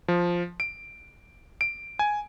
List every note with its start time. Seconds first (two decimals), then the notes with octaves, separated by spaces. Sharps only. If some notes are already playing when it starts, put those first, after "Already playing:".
0.08 F3
0.60 D7
1.61 D7
1.99 G#5